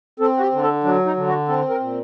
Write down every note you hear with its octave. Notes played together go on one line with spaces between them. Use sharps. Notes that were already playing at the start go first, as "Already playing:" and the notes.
C4 A4
F#4
G4
D3
A4
F#3 D4
D#4
D3
F#4
C4 A4
A#4
A#2